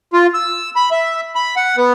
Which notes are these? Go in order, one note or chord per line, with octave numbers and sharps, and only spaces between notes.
F4
E6
B5
E5
B5
F#5
B3